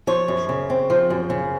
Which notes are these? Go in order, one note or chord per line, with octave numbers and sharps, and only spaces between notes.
F3 C#5
F#2
C#3
C4
F3
F#2
C#3